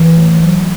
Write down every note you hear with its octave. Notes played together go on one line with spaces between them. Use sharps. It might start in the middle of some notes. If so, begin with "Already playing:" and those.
Already playing: E3
A3
F#3